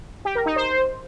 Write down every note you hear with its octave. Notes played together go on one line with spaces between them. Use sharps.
G4
A#4
D#4
C5